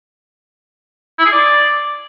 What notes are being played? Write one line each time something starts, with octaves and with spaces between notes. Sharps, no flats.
E4
G#4
D5